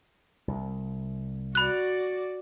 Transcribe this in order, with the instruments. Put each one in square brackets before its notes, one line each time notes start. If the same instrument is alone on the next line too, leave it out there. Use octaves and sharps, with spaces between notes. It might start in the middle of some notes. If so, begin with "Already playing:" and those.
[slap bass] C2
[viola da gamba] F#4 D5 [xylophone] B5 F#6